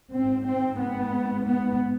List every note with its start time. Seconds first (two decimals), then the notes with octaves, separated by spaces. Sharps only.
0.14 G#2 C4
0.48 C4
0.81 B3
1.47 B3